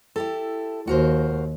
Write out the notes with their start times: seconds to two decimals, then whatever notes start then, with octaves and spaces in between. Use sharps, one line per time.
0.16 E4 G4 A4
0.87 D#2 F#4 A#4 C5